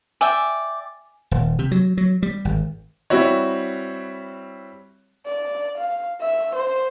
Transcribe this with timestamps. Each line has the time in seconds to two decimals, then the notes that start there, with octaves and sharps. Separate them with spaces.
0.21 D5 E5 G5 G#5
1.31 D#1
1.59 C3
1.72 F#3
1.97 F#3
2.23 G3
2.45 G#1
3.10 G3 C4 E4 F#4 C#5
5.26 D5
5.78 F5
6.21 E5
6.56 C5